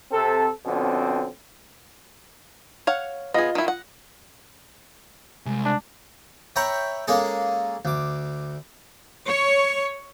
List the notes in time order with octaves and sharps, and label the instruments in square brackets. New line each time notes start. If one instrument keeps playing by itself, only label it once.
[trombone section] C3 C4 A4
F2 B2 D3 C4 C#4
[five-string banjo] C#5 F5 F#5
[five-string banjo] B3 G#4 [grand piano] F4 D#5 A#6
[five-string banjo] D#3 E4
F#5
[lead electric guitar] C2 [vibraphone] G#3
[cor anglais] D4
[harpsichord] C#5 E5 G5 A#5 B5 C#6
G#3 A#3 C#4 G#4 A4
D2 D6
[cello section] C#5